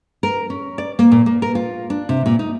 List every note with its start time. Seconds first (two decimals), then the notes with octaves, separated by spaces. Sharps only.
0.23 A#4
0.50 C#4
0.78 D5
0.99 A#3
1.12 A#2
1.26 A#3
1.42 A#4
1.55 F4
1.90 D4
2.09 C3
2.26 A#2
2.39 D#4